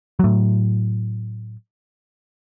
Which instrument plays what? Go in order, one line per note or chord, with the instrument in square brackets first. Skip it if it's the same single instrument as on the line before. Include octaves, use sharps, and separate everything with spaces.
[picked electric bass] A2 F#3